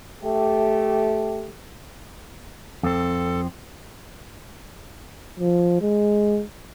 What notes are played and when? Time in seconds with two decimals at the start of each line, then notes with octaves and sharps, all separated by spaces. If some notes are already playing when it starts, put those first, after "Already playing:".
0.24 A3 G4
2.83 F2 C4 A4
5.40 F3
5.82 G#3